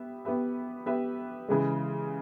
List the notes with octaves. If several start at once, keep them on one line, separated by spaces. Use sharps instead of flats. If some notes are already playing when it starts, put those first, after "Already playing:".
Already playing: B3 G4 E5
B3 G4 B4 E5
B3 G4 B4 E5
C#3 E3 G#3